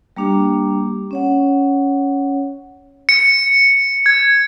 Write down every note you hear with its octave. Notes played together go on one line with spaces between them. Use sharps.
G3 A#3 D4 G4
C#4 C#5 F#5
C#7
G#6